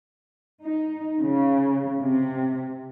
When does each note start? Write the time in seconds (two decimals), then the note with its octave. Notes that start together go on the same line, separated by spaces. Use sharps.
0.64 D#4
1.21 C#3
2.00 C3